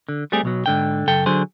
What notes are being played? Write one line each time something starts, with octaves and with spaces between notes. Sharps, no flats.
D3
G3 A3 C4 G4 G#4
B1 B2 F#3
G#2 D3 G5
F#2 C#3 A4 G5
D3 F#3 G#4 C5